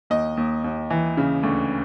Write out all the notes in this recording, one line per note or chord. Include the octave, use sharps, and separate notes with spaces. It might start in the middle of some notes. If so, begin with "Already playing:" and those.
D#2 D#5
D#2
D#2
E3
C#3
D2